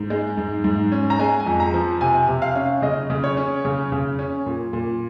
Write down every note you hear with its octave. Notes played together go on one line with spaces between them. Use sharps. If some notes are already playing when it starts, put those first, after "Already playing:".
Already playing: G#2
G#3
G#2
G#2
C#4
A#5
G#3 G#5
G#5
F2
A#5
F3
C3 G#5
C3
F5
C#4
C#3 D#5
C#3
C#5
C#4
C#3
C#3
C#4
A#2
A#2